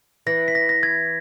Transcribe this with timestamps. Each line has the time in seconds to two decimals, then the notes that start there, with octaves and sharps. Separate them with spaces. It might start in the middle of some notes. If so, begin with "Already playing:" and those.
0.27 E3 A#6
0.48 B6
0.55 A#6
0.69 A#6
0.83 G#6